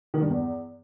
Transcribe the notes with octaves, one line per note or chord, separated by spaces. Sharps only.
D#3
G2
E2